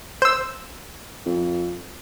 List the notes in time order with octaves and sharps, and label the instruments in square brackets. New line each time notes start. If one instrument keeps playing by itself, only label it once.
[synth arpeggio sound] C5 E6
[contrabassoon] F2